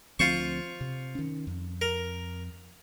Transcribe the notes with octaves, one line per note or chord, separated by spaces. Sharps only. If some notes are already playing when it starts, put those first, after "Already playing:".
D2 F3 C4 F4 C5 C#6
C3
D#3 C#4
F2
A#4